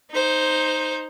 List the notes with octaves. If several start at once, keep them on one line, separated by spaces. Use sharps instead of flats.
D#4 C5